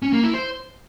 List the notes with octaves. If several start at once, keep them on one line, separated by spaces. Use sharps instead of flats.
C#4
A#3
E4
C5